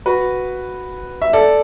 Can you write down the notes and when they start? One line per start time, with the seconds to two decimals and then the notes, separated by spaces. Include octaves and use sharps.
0.06 F#4 B4
1.22 E5
1.33 A4 D5